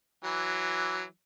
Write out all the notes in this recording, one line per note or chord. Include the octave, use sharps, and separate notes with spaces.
E3 F#3